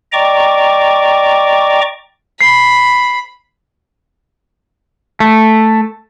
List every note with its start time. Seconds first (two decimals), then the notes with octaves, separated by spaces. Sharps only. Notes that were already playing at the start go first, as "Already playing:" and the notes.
0.13 D5 D#5 G5 A#5 C#6 D6
2.41 B5 C7
5.20 A3